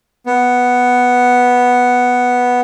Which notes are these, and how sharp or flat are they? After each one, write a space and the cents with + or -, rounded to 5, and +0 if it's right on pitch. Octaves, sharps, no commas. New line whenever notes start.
B3 +0